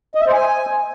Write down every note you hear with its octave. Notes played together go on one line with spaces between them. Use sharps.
D#5
E5
C5
G#5